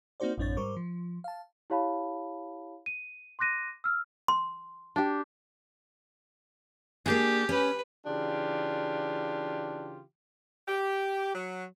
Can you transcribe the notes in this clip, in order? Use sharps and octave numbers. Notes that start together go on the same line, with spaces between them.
A#3 C4 D#4 F#4 C5 D5
A1 F#2 C4 D4 C#5 A6
G#2 G3 A#4 C5 C#6 D6
F3
F5 A5
E4 G4 C#5 F5 A5 B5
D#7
C6 D6 F#6 A#6 D#7
E6 F6
C6
D4 G4
A#3 D4 G4 G#4
C#4 B4
C#3 E3 D4 F4 G4
G4
F#3